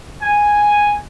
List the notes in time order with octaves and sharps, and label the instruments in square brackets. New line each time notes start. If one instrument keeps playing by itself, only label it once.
[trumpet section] G#5